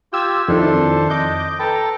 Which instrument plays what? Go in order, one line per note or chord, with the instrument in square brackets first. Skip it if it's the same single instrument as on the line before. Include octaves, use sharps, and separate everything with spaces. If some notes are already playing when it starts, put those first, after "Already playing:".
[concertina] F4 G4 [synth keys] G5 E6 G#6
[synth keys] F2 D#3 E4 [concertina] D4 A4 C5
[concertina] D#5 [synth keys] D6 G6
[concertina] A4 G5 A5 [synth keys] B4 A#5